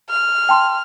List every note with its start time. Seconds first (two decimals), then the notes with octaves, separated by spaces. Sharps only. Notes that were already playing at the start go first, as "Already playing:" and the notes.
0.10 F6
0.49 G5 A5 C6